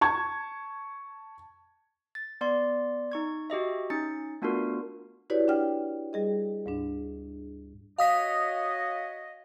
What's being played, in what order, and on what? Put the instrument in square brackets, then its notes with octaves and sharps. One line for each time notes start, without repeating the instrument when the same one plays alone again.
[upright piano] A5 C#6 G#6
[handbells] A6
B3 D5 C6
D#4 C#6 G#6
F#4 G4 D#5 E5
C#4 D#4 A6 C#7
A3 B3 D4 F4 F#4 A#4
[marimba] E4 F#4 G4 B4 C#5 D5
D4 F#5 G5 F6
G3 G#4 D#5
D2 G#2 D4
[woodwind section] F#4 C#5 D#5 [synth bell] F5 D#6 B6